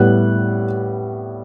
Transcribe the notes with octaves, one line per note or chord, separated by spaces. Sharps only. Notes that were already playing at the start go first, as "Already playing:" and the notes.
Already playing: A2 G3 B3 F#6